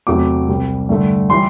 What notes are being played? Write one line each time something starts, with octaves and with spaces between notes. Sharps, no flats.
E2 C3 F#3 A3 D6
C2 C3 G3
G2 D3 A3
E3 G3 C6